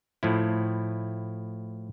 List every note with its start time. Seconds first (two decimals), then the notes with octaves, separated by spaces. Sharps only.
0.23 A2 F3 E4